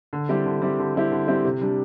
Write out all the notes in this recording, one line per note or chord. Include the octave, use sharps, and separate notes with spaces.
D3
G3 C4 E4 G4
D3
G3 C4 E4 G4
D3
G3 C4 E4 G4
D3
G3 C4 E4 G4
C3
G3 D4